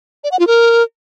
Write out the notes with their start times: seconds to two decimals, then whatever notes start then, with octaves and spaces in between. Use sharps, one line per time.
0.24 D5
0.32 F#5
0.39 F4
0.47 A#4